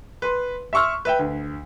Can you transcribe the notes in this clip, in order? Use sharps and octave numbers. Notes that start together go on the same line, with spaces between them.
B4 C6
E5 C6 C#6 E6 F6
B4 E5 G5
D2